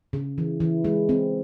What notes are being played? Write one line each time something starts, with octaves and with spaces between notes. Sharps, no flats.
C#3
E3
E3
G#3
C4